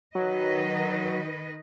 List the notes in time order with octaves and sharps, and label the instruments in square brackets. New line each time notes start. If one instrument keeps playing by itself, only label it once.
[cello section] D#3 B4 D#5 [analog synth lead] F#3